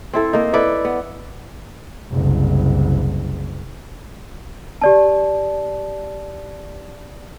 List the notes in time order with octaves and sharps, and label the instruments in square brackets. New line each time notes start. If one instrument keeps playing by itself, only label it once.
[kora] C4 E4 A4
A#3 D#4
E4 A4 B4 D5
B3
[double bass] F#1 C2
[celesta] G4 D5 A5